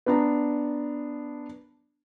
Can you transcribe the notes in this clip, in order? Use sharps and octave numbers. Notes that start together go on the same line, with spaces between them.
B3 D4 A#5